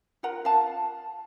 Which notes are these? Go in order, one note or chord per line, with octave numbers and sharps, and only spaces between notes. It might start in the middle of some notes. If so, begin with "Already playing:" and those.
F4 A#4 F#5 A#5
F5 A5